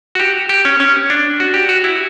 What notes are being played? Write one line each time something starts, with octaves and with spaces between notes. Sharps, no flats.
F#4
G4
G4
C#4
C#4
D4
F#4
G4
F#4
E4